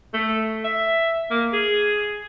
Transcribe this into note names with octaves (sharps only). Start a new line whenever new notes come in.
A3
E5
A#3
G#4